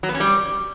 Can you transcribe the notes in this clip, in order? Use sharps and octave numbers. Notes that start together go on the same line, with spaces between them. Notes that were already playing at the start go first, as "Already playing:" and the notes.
F#3
B3
C#4
G3